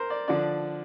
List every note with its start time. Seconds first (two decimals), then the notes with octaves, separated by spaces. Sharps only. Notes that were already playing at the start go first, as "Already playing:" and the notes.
Already playing: A#4 C5
0.10 D5
0.27 D3 F3 D4 D5